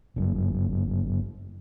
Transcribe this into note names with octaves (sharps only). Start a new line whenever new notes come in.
G1 F#2